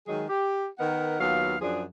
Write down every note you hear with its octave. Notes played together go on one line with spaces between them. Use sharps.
D#3 F#3 G#3 G#4
G4
D#3 B3 A#4 D#5 F#5
D#2 F#3 B3 F4 F5
F#2 F3 D4 G#4